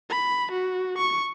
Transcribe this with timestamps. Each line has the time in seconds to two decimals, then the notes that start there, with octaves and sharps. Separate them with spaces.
0.10 B5
0.51 F#4
0.97 C#6